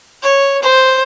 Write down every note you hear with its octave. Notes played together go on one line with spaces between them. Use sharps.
C#5
C5